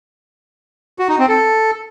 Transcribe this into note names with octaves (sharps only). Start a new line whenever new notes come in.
F#4
D#4
C4
A4